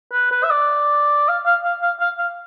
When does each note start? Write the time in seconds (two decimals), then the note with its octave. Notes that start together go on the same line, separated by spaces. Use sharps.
0.12 B4
0.32 B4
0.44 E5
0.50 D5
1.29 F5
1.46 F5
1.64 F5
1.82 F5
2.00 F5
2.18 F5